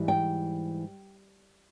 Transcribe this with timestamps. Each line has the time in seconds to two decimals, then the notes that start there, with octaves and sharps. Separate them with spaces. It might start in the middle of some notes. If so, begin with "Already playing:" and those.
Already playing: G#2 E3 G3
0.08 G5